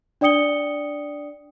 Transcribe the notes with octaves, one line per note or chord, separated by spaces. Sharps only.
D4 D5 G5 D#6 C#7 G7